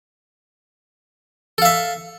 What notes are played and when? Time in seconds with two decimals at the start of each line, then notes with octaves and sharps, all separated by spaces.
1.58 A4
1.62 F5
1.65 E5